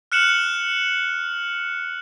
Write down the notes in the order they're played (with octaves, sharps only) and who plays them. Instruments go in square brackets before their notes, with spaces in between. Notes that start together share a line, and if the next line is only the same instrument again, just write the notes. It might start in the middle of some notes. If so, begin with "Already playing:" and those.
[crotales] F6 F#6 C#7 E7 F#7